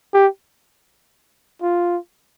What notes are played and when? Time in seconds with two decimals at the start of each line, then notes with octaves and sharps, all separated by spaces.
0.14 G4
1.62 F4